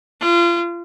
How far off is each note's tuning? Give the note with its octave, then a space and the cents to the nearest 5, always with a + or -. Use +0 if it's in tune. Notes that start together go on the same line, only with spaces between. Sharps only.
F4 -30